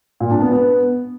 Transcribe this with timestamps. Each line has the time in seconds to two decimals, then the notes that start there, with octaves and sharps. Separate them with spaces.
0.20 A#2
0.31 D4
0.42 B3
0.52 B3